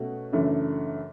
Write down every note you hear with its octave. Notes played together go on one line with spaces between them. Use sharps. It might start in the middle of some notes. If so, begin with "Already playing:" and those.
Already playing: B2 A3 C#4 F#4
F#2 C#3 E3 A3 D4